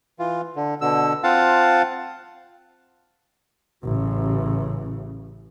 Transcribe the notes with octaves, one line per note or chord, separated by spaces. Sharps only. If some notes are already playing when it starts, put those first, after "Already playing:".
E3 F4
D3
B2 D3 E6
C4 F4 F5 F#5 A5
A1 C#3